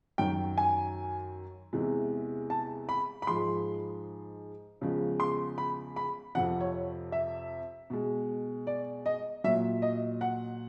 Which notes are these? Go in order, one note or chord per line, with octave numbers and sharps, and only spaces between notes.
F#2 D#3 F#3 G5
G#5
E2 C3 E3 G#3
A5
B5
B5
G#2 F3 G#3 C6
E2 C#3 F3 G#3
C6
B5
B5
F2 C3 F3 F#5
C#5
E5
B2 G#3
D5
D#5
A#2 F#3 E5
D#5
F#5